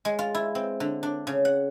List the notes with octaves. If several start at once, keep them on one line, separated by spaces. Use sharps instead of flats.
G#3
F4
E4
C4
D3
D4
C#3
F#5